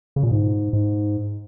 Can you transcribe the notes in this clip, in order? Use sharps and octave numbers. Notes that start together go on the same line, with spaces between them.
C#3
A#2
G#2
G#2